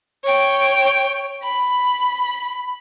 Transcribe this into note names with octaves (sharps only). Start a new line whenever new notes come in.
C#5 G5
B5